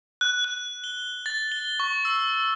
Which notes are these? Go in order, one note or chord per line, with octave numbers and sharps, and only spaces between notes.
F#6
F#6
G7
A6
G7
C#6
E6